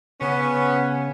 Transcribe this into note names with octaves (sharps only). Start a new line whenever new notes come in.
C#3 B3 C#4